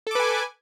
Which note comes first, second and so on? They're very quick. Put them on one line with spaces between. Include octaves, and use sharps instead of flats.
A4 D6 B4 G#5